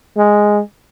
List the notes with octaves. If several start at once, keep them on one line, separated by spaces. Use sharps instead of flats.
G#3